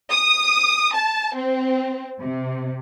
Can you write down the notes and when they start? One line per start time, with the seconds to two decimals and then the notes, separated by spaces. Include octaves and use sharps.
0.11 D#6
0.93 A5
1.35 C4
2.20 C3